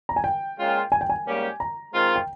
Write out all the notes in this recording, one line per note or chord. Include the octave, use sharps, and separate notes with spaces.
A#5
G#5
G5
A#2 G#3 C#4 F4
G#5
G5
G#5
G#2 G3 A#3 C#4 G4
A#5
D#3 G#3 C4 F4
G5